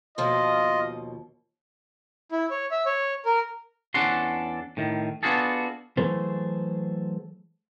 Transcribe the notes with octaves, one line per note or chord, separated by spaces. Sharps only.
D#2 B2 F3 F4 D#5
E4
C#5
E5
C#5
A#4
E2 C#4 D4 A4 F#5 C6
A2 D#3
B3 D4 F4 F#4 G#4 A4
E3 F#3 A3 G#4 A4 C5